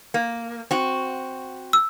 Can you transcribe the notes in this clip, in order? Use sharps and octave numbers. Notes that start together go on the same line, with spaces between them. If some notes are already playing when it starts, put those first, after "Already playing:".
A#3
C4 F#4
E6